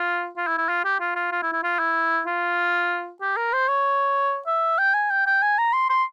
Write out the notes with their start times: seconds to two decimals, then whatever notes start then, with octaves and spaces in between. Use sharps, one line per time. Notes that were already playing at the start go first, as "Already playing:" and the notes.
Already playing: F4
0.37 F4
0.47 E4
0.58 E4
0.69 F4
0.85 G4
1.00 F4
1.16 F4
1.32 F4
1.43 E4
1.53 E4
1.63 F4
1.79 E4
2.27 F4
3.21 G4
3.37 A#4
3.53 C5
3.68 C#5
4.47 E5
4.78 G5
4.94 G#5
5.11 G5
5.26 G5
5.42 G#5
5.58 A#5
5.73 C6
5.90 C6